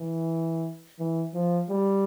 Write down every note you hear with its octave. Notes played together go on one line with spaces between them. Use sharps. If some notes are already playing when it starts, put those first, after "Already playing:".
Already playing: E3
E3
F3
G3